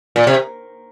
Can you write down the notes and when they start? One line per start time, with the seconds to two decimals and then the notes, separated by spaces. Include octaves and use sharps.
0.16 A#2
0.27 C3